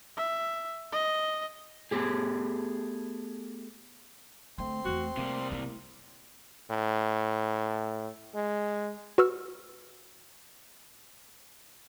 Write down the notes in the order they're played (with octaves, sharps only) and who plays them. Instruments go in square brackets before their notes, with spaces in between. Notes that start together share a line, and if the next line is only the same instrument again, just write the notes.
[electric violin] E5
D#5
[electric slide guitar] A3 B3 G4 G#4
[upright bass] D3 A3 [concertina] C4 C6
[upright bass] E2 A3 [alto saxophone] F#4
[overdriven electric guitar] C3 G3 [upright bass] A3 [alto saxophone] A#3
[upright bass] A3 E4
[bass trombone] A2
G#3
[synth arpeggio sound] F#4 B4 C#6 E6 F6